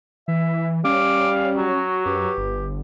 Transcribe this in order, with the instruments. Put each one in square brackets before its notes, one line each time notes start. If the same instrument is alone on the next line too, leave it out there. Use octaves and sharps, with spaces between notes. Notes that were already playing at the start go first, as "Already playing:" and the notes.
[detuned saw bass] E3 [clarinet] E5
[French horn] G3 [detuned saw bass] C#4 [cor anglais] F5 [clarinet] D6
[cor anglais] F#3 [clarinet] F#4
[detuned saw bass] F#2 [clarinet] G4 [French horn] B4
[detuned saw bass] G1